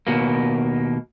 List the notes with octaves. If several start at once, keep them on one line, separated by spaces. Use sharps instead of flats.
D#2 B2 A#3